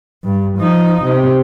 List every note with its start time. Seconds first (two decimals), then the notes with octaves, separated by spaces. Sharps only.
0.24 G2
0.59 F3 D#4
1.04 C3